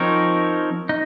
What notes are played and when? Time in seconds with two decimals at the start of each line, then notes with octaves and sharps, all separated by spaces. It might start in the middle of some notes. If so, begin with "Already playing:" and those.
Already playing: F3 C4 D#4 A#4 C#5
0.89 D#4